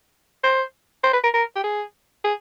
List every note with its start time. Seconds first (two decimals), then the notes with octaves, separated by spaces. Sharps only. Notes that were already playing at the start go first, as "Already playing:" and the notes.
0.44 C5
1.04 C5
1.13 B4
1.24 A#4
1.34 A#4
1.56 G4
1.64 G#4
2.24 G#4